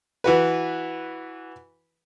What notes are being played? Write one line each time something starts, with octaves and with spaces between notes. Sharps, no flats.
E3 F#4 B4